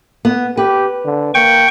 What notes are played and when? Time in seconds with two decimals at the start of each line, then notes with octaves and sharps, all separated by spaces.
0.25 B3
0.57 G4 B4
1.05 D3
1.34 A#3 G5 C#6